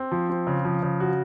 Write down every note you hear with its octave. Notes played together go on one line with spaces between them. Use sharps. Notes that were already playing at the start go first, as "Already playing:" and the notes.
Already playing: C4
F3
C4
C#3
F3
C#3
F#4